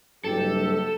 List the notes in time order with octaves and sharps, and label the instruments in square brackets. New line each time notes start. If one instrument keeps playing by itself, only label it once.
[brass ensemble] F#1 G2 G4 [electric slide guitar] A4